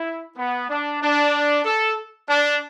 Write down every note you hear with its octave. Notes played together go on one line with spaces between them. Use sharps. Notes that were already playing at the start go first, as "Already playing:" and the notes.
Already playing: E4
B3
D4
D4
A4
D4